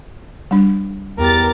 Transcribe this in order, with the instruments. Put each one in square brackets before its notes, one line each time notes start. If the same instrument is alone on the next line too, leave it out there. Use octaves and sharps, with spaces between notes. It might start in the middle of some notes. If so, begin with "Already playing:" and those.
[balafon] G3 D4
[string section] E2 G4 A6 [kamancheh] A#4